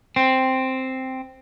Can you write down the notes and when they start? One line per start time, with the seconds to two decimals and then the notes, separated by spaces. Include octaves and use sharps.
0.16 C4